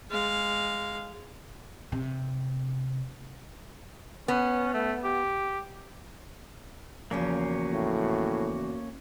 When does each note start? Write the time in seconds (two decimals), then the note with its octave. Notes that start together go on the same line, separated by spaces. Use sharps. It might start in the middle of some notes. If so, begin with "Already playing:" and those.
0.10 G#3 F5
1.92 C3
4.28 B3 C#4
4.74 A3
5.04 G4
7.11 E2 C#3 F3 A#3 C#4 F#4
7.73 A2